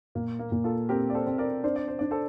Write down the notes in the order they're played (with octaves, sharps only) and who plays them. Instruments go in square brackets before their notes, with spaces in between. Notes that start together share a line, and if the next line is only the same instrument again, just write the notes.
[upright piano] A#2 [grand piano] A#3
[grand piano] A#3
[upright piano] A#2
[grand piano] F4 A4
[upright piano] C4 [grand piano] G4 A#4
[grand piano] D5
A4 C5
[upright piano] C4
[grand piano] A#4 D5
[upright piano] D4 [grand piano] C5
[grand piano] D5
C5
[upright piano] D4 [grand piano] D5
[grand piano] A4 C5